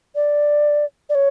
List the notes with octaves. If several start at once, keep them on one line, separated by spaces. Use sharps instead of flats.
D5
D5
C#5